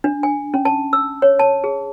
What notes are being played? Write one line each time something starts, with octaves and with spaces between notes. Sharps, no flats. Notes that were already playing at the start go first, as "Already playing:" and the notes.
D4
G#5
C#4
A5
E6
C#5
A5
G#4